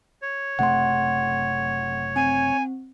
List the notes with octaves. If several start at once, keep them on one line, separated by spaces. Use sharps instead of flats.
C#5
F#1 C3 A3 F#5 C6
C4 G#5